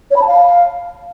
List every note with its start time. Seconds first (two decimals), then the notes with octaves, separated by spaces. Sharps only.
0.11 C#5
0.16 B5
0.22 A5
0.27 F5